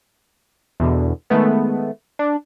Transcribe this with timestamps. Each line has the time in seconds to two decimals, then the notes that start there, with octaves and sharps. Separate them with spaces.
0.80 E2 B2 D3
1.30 D#3 G#3 A3 B3
2.19 D4